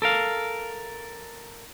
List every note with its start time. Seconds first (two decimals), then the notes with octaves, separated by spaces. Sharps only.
0.02 A4 A#4 F5